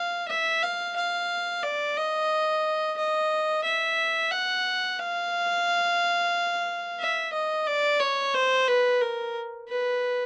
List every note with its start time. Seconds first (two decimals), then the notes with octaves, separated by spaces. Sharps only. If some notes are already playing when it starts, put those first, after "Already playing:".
Already playing: F5
0.28 E5
0.63 F5
0.96 F5
1.63 D5
1.97 D#5
2.97 D#5
3.64 E5
4.31 F#5
4.99 F5
7.00 E5
7.33 D#5
7.67 D5
8.00 C#5
8.34 C5
8.68 B4
9.01 A#4
9.69 B4